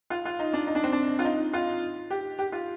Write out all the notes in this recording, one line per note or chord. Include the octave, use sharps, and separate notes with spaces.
F4
F4
D#4
D4
D#4
D4
C4
D4
F4
D#4
F4
G4
G4
F4